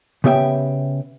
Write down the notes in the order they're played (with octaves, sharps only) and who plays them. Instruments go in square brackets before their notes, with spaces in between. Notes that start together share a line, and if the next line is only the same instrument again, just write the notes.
[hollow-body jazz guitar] C#3 B3 G4 E5 G5